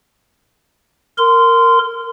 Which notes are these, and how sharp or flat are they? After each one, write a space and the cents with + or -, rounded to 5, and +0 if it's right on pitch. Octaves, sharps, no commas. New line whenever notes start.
A#4 -10 C6 -20